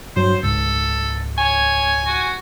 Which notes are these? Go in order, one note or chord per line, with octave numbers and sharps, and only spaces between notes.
G2 F#3 C5
C#2 G#2 A4
C#5 G#5
F#4